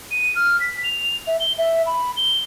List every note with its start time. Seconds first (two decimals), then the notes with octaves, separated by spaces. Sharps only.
0.11 D#7
0.36 F6
0.60 B6
0.84 F7
1.27 E5
1.40 G7
1.58 E5
1.86 B5
2.17 G7